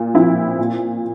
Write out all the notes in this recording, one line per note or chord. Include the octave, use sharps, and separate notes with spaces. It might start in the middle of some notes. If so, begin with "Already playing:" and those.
Already playing: A#2
F3 C4 E4
A#2